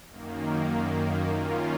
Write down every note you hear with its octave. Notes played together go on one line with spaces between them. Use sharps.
F#2 D#3 A#3
F#2 D#3 A#3 C#4 F4